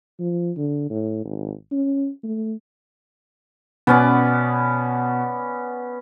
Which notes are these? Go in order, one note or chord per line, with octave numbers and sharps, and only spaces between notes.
F3
D3
A2
G#1
C#4
A3
B2 B3 C#4 D5